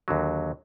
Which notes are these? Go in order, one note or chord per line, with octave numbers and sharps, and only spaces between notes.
D#2 D3 F#3